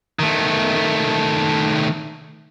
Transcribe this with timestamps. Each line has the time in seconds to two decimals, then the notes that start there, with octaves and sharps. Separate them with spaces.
0.19 D#3 A3